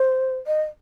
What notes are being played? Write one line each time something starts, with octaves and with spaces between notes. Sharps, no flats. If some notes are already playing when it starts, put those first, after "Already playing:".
Already playing: C5
D#5